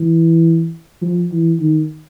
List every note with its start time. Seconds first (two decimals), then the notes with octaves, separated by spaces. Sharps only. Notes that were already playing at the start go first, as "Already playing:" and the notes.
Already playing: E3
1.02 F3
1.31 E3
1.60 D#3